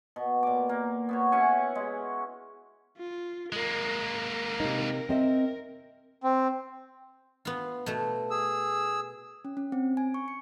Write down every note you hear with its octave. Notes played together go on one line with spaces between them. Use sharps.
B2
A#2 D6
A#3
B3 F#4 C#5
C#4 E4 F#5 G#5
G#3
F4
G#3 A#3 A#4
C3 D#4
C4 D#5 E5
C4
B3 F4
B2 A3
G#4 E6
C#4
C#4
C4
G#5
C#6
C#7